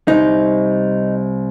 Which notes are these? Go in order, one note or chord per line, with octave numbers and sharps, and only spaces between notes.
C2 D#4